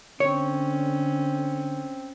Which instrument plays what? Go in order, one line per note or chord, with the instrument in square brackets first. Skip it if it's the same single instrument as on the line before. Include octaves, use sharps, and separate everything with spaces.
[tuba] D3 [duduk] C4 [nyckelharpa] C#4 [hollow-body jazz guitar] C#5